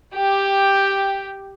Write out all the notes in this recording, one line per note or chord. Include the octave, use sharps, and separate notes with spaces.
G4